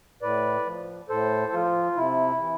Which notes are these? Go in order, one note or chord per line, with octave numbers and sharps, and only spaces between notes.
A2 B4 D5
F3
A2 A4 C5
F3 F4
C3 E4
E3